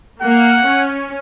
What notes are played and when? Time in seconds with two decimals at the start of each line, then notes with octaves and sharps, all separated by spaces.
0.22 A#3 F#5
0.66 C#4